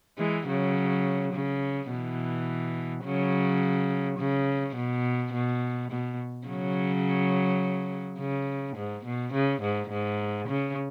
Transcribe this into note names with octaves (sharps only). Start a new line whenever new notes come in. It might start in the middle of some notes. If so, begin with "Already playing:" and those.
E3 G#3
C#3 F#3
C#3
B2 E3
C#3 F#3
C#3
B2
B2
B2
C#3 F#3
C#3
G#2
B2
C#3
G#2
G#2
C#3